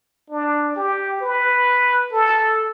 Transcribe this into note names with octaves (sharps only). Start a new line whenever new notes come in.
D4
G4
B4
A4